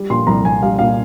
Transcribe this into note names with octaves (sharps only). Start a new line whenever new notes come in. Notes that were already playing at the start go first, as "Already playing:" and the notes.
Already playing: G3
A#2 C6
C2 A#5
C2 G#5
G3 F5
A#2 F5